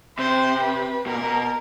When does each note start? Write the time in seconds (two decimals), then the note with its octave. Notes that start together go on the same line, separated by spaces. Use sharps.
0.18 C3 C5
0.63 B4
1.07 B2 A#4
1.15 A#2
1.22 B2